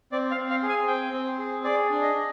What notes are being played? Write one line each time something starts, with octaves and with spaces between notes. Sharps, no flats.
C4 D5
F5
C4
F5
G#4
G#5
C4 G5
C4
G#4
G#4 D5
D4
D#5
D4